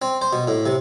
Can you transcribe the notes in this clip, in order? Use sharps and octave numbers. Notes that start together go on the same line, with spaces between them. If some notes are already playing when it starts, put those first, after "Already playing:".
C4
C5
B2
A2
C3